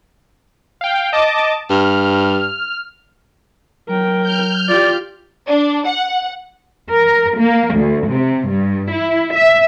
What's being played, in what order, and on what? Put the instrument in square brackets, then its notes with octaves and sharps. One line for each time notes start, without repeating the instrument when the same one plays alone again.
[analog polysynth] F5 G5
D#5 A5 D6
[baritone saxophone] G2 [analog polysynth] F6
[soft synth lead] F#3 [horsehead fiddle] A#4 G5
[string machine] F6 G6
[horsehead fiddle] F4 G4 [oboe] D5
[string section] D4
F#5
[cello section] A#4
A#3
D2
C3
G2
E4
E5